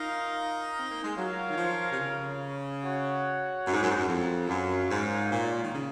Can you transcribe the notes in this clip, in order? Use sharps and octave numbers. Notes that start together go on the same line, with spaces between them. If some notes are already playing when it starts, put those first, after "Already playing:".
Already playing: D#4 F4 A#4 F5
C4
A#3
G#3
F#3 F4 A#4 C#5 F5
D#3
F3
C3
C#3
F#4 C#5 F#5
F#2
G#2
F#2
G#2
F#2
F2
F#2 F4 A#4 C#5 F5
G#2
A#2
D#3
C#3